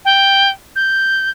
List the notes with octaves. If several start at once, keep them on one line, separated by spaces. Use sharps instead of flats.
G5
G6